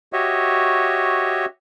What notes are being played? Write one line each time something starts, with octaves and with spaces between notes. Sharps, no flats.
F#4 G4 C#5 D#5 E5